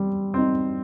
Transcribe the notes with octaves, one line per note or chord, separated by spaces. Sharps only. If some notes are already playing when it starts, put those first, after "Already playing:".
Already playing: G3 C4
C4 D#4